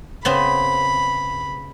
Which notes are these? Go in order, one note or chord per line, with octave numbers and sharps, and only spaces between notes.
C#3 B3 C4 B5